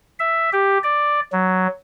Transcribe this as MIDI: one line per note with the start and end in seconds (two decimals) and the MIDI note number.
0.20 0.50 76
0.53 0.78 67
0.84 1.20 74
1.33 1.67 54